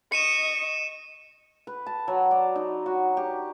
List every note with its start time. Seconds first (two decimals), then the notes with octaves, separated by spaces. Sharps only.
0.12 D#5 C#6 C#7 D#7 E7
1.67 B4
1.86 A5
2.08 F#3
2.31 D5
2.56 D#4
2.86 F#4
3.17 G4